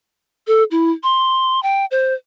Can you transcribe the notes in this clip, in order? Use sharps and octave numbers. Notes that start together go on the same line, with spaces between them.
A4
E4
C6
G5
C5